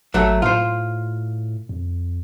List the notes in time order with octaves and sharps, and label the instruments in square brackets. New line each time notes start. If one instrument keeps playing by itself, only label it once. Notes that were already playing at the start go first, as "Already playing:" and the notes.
[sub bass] G#1 [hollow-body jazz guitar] F#3 A3
[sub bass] A2 [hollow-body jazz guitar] F4 C5
[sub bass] F2